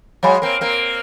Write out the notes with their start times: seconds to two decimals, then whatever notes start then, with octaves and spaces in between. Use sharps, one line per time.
0.23 F#3 G#3 C#5 F5 G#5 B5
0.42 A#3 C4
0.61 A#3 C4